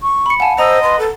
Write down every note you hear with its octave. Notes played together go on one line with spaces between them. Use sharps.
C#6
B5 C#7
F5 F#5 G#5 A5
C5 D#5 A#5 E6
B4 C6
A4